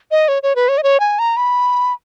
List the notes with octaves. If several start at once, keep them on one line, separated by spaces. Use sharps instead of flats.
D#5
C#5
C#5
B4
C#5
D#5
C#5
G#5
A#5
B5